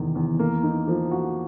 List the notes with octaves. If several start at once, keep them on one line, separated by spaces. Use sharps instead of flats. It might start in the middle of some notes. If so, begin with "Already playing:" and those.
Already playing: E2 C3 D#3
E2
A#3
D#4
F3
F#4